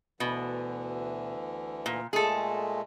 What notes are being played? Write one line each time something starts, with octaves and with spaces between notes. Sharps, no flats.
D2 B2 D3 E3
A#2
A#2 G#3 A3 G#4 A4